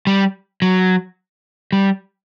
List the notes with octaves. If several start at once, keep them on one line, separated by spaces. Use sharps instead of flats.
G3
F#3
G3